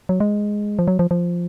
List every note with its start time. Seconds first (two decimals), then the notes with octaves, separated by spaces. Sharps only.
0.09 F#3
0.20 G#3
0.79 F3
0.88 F#3
0.99 F3
1.11 F3